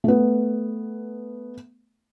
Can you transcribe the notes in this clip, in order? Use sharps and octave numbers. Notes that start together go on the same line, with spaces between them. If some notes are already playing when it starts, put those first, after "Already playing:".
A3 B3